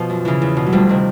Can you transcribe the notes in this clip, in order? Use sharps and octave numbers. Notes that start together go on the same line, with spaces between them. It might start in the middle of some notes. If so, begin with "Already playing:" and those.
Already playing: B2 F3
F#2
C#3 E3
E2
B2
F#3
D2 F3 G3
C3 D#3